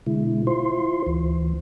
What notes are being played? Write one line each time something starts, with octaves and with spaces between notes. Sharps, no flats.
B2 D3 G#3 E4
E4 F4 C5 C6
D2 E3